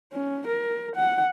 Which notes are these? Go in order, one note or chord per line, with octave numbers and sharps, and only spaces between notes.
C#4
A#4
F#5